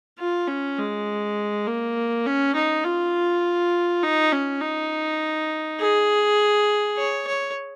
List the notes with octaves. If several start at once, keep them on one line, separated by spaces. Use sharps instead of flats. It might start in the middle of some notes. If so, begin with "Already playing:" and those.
F4
C#4
G#3
A#3
C#4
D#4
F4
D#4
C#4
D#4
G#4
C#5
C#5